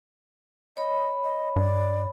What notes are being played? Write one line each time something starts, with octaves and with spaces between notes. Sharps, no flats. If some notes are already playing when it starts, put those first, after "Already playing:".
C#5 D#5 B5
D#5
G2 D5